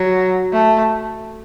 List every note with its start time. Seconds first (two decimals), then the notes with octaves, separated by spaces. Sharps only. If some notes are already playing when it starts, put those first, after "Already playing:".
Already playing: F#3
0.53 A3